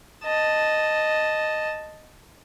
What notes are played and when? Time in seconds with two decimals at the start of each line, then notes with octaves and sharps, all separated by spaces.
0.25 D#5 A5